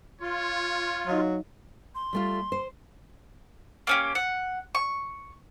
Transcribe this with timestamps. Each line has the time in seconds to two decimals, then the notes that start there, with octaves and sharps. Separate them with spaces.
0.21 F4 C#5
1.07 F#3 D#4 D#5 F5
1.95 C6
2.13 G3 A3 F4
2.52 C5
3.87 A#3 C#4 G4
4.15 F#5
4.75 C#6